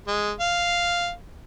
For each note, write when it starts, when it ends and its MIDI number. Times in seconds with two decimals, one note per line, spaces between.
0.07 0.32 56
0.40 1.11 77